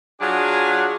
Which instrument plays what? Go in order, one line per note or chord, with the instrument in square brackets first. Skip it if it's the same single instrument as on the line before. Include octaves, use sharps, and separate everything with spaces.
[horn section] F#3 D4 F4 G#4